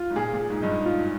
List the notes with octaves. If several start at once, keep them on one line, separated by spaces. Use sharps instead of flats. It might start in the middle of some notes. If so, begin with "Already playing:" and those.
Already playing: F4
G#2
A#2 G#4
A#2
G#4
G#2
G2 D#4
G#2
F4